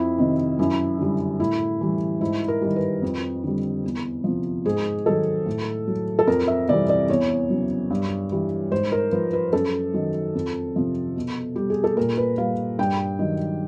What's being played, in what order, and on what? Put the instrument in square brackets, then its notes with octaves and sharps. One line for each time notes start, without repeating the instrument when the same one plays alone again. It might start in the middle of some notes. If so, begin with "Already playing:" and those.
Already playing: [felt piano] F2 E4
C3 D#3
F#2 E4
D3 G3
A2 E4
E3 G3
G#2 E4
A#4
D#3 G3
B4
F2
D3 G3
E2
C3 F3
G#2 G#4
D#3 F#3 A4
A2
F#3
A4
F2 A#4
E5
C3 E3 G3 D5
D5
E2 C#5
C#3 F#3
G2
E3 G3
G#2 C5
A#4
F3 B4
B4
F#2 A4
D#3 F#3
F2
C3 F3
B2
G3 G4
G#4
A4
A#2 A#4
B4
G3 F5
G2 G5
D#3 F#3